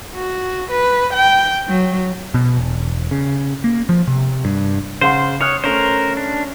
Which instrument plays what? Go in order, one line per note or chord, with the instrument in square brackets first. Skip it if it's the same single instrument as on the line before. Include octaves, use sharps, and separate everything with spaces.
[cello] F#4
B4
G5
F#3
[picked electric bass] B2
E1
C#3
A#3
F3
C3
G2
[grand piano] C#3 F#5 C6 [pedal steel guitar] C5
[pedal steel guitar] C#5 [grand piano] D#6 F6 F#6
[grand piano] A3 C#4 [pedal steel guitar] A#4 C5
[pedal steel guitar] D4